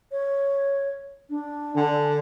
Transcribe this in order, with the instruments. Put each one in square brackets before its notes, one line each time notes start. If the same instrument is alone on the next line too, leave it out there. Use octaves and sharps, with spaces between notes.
[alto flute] C#5
D4
[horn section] D3 [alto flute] G#5